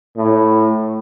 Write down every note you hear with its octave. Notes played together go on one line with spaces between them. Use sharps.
A2